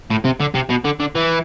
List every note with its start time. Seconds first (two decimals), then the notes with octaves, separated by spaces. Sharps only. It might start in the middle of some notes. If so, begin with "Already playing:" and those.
0.10 A2
0.25 C3
0.40 D3
0.55 C3
0.70 B2
0.84 D3
1.00 D3
1.15 E3